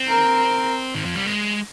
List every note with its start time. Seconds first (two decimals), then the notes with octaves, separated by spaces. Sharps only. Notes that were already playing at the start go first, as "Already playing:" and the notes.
Already playing: C4
0.09 A#4
0.95 D#3
1.05 F3
1.15 G3
1.26 G#3